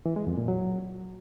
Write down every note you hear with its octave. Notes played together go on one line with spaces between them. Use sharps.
E3
G#3
F2
A#2
F#3